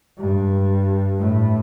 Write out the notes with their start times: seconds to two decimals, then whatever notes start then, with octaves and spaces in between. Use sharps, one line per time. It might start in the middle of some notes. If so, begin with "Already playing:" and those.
0.18 G2
1.18 A2